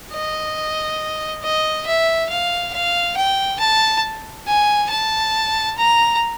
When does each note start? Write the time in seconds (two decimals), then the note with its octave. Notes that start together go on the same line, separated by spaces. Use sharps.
0.13 D#5
1.43 D#5
1.86 E5
2.30 F5
2.73 F5
3.17 G5
3.60 A5
4.47 G#5
4.90 A5
5.78 A#5